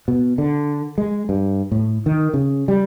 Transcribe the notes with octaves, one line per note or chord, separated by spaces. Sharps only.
B2
D3
G#3
G2
A2
D#3
C#3
G3